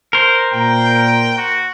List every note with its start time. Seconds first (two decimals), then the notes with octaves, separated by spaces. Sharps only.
0.13 A#4 C5
0.53 A#2 G5 A#5
1.38 F#4